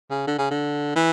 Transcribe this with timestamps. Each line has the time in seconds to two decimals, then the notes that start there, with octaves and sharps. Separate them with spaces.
0.10 C#3
0.27 D3
0.38 C#3
0.51 D3
0.96 E3